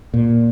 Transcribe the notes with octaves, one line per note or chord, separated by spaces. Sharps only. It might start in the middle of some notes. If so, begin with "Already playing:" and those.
A#2